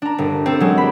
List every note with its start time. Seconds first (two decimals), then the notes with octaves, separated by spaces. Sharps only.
0.02 D4 A#5
0.18 G1
0.46 C4 A4
0.60 F#3 G#3
0.78 G4 B5